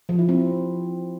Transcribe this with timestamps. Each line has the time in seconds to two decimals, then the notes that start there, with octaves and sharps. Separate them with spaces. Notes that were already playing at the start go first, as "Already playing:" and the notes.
0.09 F3
0.19 E4
0.29 C4